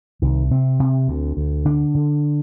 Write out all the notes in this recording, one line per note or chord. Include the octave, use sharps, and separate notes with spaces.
C2 D#3
C3 C4
C3
D2
D2
D3 D4
D3